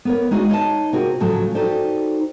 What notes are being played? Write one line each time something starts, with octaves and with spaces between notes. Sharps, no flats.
B3 A#4 C#5
G#3 D#4 F#4 G#4 D5 F5
D#4 C#5 D#5 A5
C3 F4 F#4 G#4 A#4
A2 C#3 F3 F#3 A4
D#4 F#4 G4 A4 C5 D5